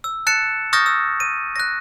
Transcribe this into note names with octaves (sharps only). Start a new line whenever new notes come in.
E6
A5 F#6 A6 C#7 E7
C#6 D#6 F6 G6 A6 A#6
E6
D#7
F#6 A#6